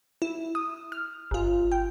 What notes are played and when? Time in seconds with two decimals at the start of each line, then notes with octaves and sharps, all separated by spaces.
0.22 E4
0.55 D#6
0.92 F6
1.31 G1 F4
1.72 G5